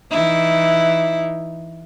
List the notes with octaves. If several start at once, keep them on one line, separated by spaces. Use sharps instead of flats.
E3 D#4 E4